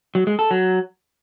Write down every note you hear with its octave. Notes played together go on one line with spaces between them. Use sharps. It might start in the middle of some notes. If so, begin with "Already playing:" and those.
F#3
G#3
A4
F#3